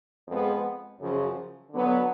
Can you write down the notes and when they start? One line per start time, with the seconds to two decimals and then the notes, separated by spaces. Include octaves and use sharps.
0.28 F2 F3 G#3 B3
1.00 F#2 C#3 F3
1.71 D3 F#3 B3